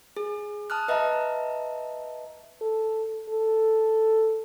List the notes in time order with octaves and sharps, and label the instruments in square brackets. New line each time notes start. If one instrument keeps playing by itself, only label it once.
[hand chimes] G#4
A5 D#6 F6 F#6
B4 D#5 E5 A5 A#5
[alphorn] A4
A4